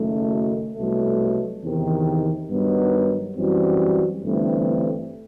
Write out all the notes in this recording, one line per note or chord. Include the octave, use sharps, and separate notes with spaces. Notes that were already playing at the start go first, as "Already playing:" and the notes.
Already playing: F#1 F#2 D#3 A3
C2 B2 F#3 A3
E2 C3 D#3
G2 D#3 F#3 B3 D#4
F#2 E3 G3 C4 F#4
G1 G2 E3 A3 C4